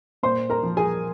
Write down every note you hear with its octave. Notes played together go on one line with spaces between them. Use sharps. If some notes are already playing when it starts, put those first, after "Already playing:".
A#2 C5 C6
A#4 A#5
F3
G#4 G#5